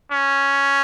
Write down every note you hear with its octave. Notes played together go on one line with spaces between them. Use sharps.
C#4